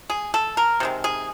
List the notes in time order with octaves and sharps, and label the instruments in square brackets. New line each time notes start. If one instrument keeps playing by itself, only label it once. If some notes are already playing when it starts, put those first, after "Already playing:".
[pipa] G#4
A4
A#4
C3 D#3 G#3
G#4